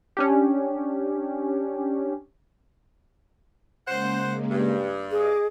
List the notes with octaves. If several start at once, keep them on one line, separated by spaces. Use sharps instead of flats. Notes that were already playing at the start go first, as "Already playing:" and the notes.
C#4 D4 G4
C#3 G#3 A#3 C5 F#5
G2
G#4 D#5 D6